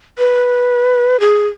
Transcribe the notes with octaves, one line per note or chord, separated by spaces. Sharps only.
B4
G#4